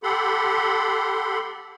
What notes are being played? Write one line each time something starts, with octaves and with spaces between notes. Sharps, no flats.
G4 A4 F#5 B5 C6